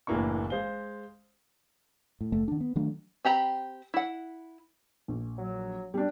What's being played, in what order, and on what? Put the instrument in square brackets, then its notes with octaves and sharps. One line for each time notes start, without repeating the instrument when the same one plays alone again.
[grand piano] F#1 A2 E3 A#3 D4 C#6
G#3 G#4 C5 F5 G7
[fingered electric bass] A2
F#1 A3
D#3 D4
B3
D#3 F#3 A3 D4
[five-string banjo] C4 G4 A#5 B5
E4 F#5
[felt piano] A#1
[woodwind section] F#3
[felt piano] G3 D4